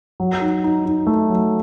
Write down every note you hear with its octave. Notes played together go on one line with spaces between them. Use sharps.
F#3
D#4
D#4
D#4
A3
F#3